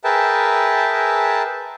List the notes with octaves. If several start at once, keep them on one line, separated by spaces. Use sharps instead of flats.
G#4 A#4 B4 E5 G5 A5